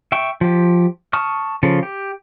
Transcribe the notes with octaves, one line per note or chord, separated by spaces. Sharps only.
E5 G5 C#6
F3 G4
A5 C#6 D#6 F6
C#3 F3 A4
G4